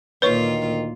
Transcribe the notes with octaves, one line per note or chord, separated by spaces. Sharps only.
D2 A#2 D#3 F4 B4 C#5 C#6